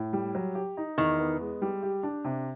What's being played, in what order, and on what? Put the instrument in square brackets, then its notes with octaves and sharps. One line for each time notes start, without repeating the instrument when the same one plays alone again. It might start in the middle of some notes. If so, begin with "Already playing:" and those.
Already playing: [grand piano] A2
G3
F#3
G4
D#4
[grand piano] E2 [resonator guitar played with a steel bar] D#3
[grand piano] B3
G#3
G3
G4
D4
C3